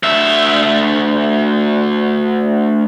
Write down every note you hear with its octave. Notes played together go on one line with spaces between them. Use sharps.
D2 E5